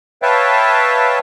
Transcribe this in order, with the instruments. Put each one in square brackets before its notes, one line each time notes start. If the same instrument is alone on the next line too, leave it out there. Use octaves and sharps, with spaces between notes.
[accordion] B4 C#5 E5 F5 G5 A5